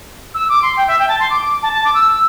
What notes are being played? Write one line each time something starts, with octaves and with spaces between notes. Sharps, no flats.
E6
D6
C6
G5
E5
G5
A5
C6
D6
D6
A5
A5
D6
E6
E6